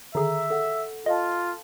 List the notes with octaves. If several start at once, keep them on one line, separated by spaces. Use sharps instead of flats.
D3 D#3 G#4 A4 E5 A#5
A4 F#5
F4 A4 D#5 F5 A5